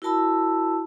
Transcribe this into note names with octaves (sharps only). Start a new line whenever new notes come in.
E4 F#4 A#4 A5 B5 E6